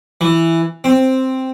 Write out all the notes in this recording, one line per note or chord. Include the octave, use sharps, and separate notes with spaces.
E3
C4